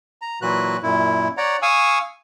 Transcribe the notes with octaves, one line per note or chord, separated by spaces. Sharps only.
A#5
A#2 E3 F#3 F#4 B4 F#6
F#2 A#2 E4
C#5 D5 F#5 A#5
F5 G#5 C#6 D#6 E6